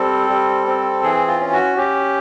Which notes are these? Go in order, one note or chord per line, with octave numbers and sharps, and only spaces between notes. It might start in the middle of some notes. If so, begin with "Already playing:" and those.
Already playing: G3 C4 A4
G3
C4
E3 G#4
F4
C#4
F#4
C#4 G4